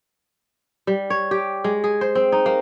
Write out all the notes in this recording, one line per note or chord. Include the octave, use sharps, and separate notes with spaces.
G3
C#5
G4
G#3
G#4
C5
C4
D#4
A#3